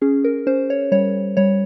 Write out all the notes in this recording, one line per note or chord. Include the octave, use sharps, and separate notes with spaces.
C#4 G#4
A#4
C#4 C5
C#5
G3 C#5
G3 C#5